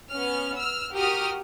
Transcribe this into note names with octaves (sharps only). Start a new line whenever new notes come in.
B3 C#4 F6
E6 F6
F#4 G4 A#4 D#6 F6